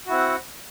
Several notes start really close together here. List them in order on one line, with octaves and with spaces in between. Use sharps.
F#4 E4 C4 F#5